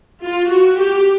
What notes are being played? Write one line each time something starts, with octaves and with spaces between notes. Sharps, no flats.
F4
F#4
G4